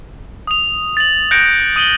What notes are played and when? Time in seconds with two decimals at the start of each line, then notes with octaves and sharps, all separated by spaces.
0.47 D#6 F7
0.97 A6 F#7
1.31 F#6 G6 A#6 C#7 D7
1.76 D#6 D#7 F#7 G7